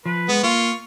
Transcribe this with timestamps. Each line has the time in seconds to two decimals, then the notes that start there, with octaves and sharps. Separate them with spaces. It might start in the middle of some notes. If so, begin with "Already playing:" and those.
0.06 F3 B4
0.29 G#3 B3
0.43 A#3 F4 C#6